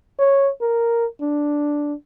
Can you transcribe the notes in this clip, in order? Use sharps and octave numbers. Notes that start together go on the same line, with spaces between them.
C#5
A#4
D4